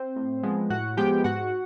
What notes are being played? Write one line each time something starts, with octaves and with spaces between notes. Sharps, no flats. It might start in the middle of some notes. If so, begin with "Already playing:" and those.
Already playing: C4 C5
A2
F3 G#3 B3
A2 F#4 F#5
F3 G#3 B3 G4 G5
G#2 F#4 F#5